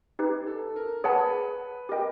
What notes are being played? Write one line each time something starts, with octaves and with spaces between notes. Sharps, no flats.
D#4 G4 B4
A4
A#4
G#4 B4 C#5 F#5 A5
G4 A#4 D#5 G5